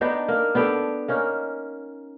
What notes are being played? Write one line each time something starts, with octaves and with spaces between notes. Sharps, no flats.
B3 D4 D#4 G4
A#3
B3 D4 G4 A4
A#3 C#4 D#4